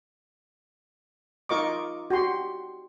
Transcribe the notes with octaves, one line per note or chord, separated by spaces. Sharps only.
D#4 F4 A#4 D#5 C#6 D6
F#4 G4 C6